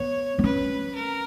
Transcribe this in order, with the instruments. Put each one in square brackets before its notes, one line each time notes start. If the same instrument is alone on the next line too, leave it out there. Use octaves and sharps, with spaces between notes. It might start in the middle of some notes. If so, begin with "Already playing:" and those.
Already playing: [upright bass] B3 [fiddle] C#5
[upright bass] B3
[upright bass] C#4 [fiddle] B4
[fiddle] A#4